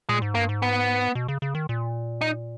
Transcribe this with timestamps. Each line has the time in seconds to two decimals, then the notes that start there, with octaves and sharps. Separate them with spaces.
0.09 A#2 G#3
0.22 G#2
0.35 G2 A#3
0.49 G#2
0.62 B3
1.15 B2
1.28 C#3
1.42 C#3
1.55 D#3
1.69 A#2
2.21 D#4